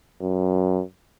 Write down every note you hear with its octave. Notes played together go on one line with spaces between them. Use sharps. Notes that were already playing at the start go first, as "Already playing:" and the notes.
F#2